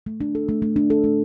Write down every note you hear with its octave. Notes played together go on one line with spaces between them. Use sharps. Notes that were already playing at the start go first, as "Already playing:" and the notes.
A3
D4
A4
A3
A3
D4
A4
A3